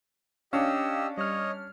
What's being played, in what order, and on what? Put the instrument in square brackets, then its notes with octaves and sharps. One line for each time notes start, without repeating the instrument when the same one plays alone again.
[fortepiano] C#4 D4 [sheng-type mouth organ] G4 D#5 E6 [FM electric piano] F5
[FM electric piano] G3 F6 [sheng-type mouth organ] C#5 D#5